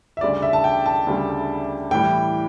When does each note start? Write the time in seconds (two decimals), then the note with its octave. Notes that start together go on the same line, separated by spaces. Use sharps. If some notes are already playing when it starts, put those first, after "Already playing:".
0.17 E5
0.21 D2 C#3 G3 D5
0.42 E5
0.53 A5
0.64 G5
0.86 A5
1.07 D2 C#3 G3
1.91 A2 E3 G3 G5